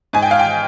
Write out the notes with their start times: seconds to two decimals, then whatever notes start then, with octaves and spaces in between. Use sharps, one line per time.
0.13 G#2 G#5
0.22 G5
0.31 F5
0.39 G5